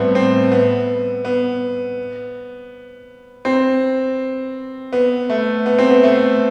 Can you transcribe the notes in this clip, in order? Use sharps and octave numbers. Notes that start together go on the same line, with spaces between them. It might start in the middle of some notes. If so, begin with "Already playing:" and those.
Already playing: A2 G3 A3 B3 C4
C4
B3
B3
C4
B3
A3
B3
C4
B3
A3